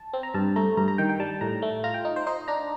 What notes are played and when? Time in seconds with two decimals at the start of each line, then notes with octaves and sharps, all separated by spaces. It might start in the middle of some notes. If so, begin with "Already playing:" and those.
Already playing: A5
0.13 C4
0.23 A#5
0.34 G2 A5
0.56 A3 A#5
0.77 G2 A#5
0.88 A#5
0.98 D#3 G5
1.09 G5
1.19 G3 A5
1.41 A2 A#5
1.62 A3
1.84 F4 A#5
1.94 G5
2.05 D#4
2.16 C5
2.27 D#4 C5
2.48 D4 A#5